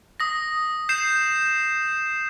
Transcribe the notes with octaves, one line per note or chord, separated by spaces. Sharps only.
D#6 A#6
G6 C7 E7